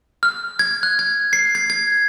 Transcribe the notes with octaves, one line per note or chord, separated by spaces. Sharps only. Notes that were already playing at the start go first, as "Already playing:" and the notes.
F6
G#6
F#6
G#6
C7
G#6
G#6